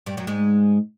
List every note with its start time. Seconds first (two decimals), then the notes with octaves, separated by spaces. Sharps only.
0.06 G2 G3
0.17 F#2 F#3
0.27 G#2 G#3